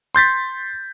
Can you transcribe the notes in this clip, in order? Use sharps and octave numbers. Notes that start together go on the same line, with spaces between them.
C6 G6 A6 B6